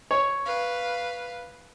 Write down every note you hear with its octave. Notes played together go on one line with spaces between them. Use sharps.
C#5
B4 F5